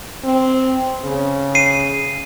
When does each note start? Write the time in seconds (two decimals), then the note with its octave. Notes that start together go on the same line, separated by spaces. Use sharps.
0.24 C4
1.04 C#3
1.55 C7 D#7